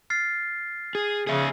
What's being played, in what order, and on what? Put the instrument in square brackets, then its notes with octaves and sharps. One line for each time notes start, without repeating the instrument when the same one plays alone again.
[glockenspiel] F6 A6 C7
[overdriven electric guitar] G#4
[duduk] C#3 [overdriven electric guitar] G#4 E5